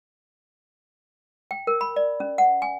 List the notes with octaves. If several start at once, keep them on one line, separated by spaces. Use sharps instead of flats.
G5
A#4
B5
D5
C#4
F#5
G#5